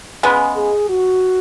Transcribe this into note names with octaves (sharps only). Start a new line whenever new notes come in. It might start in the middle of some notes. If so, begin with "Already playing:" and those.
C#3 G#3 B3
G#4
F#4